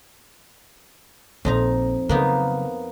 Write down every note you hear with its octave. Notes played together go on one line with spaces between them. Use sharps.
A#1 F2 D#4 A#5
C#3 F#3 A#3 B3 D#4